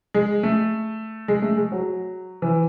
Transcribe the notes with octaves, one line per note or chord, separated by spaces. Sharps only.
G#3
A3
G#3
A3
G#3
F#3
E3